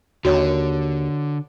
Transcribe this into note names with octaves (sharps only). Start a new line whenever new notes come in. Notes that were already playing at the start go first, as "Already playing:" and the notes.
D#2 D3 F#4 C#5